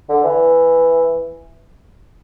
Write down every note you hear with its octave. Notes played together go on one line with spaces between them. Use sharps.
D3
E3